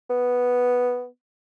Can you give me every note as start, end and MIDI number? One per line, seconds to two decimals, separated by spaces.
0.10 1.06 59